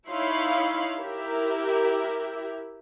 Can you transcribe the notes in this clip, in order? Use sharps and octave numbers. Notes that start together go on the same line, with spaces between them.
D#4 E4 C#5 F5 B5 C6
E4 G4 A#4 E5